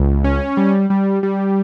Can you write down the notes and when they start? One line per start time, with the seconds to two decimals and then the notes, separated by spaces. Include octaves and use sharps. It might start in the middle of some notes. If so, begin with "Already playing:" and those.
Already playing: C#2
0.24 C#4
0.57 G3
0.90 G3
1.23 G3